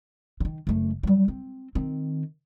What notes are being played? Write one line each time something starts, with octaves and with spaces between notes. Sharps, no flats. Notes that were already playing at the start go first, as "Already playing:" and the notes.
D3 D#3
F#1 A3
F#3 G3
C4
D#3 C4